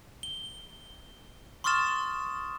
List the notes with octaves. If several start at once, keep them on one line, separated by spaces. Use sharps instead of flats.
G7
C6 C#6 D#6 F6 A6 E7